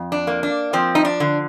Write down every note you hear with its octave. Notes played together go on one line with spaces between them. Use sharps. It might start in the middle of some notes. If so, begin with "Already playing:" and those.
Already playing: F2
D4
A#3
D4
F3 C4
D#4
D4
D3